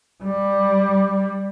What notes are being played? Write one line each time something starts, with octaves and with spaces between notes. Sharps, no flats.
G3